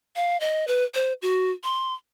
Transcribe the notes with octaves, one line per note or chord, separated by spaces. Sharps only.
F5
D#5
B4
C5
F#4
C6